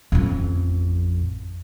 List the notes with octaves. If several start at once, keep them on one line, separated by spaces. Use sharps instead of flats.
A1 F2